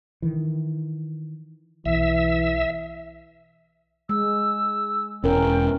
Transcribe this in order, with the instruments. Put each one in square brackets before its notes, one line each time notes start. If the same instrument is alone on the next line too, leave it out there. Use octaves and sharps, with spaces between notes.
[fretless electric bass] D#3 E3
[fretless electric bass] B1 [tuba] E3 [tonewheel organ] E5
[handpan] G#3 [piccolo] E6
[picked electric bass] E1 [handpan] C#4 A#4 [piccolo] G5